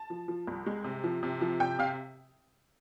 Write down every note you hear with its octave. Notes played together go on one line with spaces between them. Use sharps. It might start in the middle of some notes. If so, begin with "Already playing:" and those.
Already playing: A5
F3
F3
C2
G#3
C3
F3
C3
F3
C3 G5
C3 F5